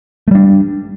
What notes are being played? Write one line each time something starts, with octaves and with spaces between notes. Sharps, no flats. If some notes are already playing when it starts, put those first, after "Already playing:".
G3 A3 D4